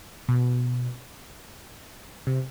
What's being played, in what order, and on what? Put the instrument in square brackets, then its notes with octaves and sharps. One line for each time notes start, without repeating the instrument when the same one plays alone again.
[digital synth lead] B2
C3